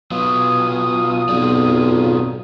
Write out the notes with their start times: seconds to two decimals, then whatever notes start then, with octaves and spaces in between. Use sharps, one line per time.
0.11 F#3 B3 F4 D#6
1.29 B1 C4 G#4 D5